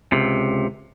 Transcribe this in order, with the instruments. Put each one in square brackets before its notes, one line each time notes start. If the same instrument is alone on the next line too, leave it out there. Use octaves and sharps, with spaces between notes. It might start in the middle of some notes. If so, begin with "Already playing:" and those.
[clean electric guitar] C#2 C3